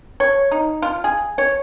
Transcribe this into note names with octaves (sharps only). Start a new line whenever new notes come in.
C#5
D#4
F4
G#4
C#5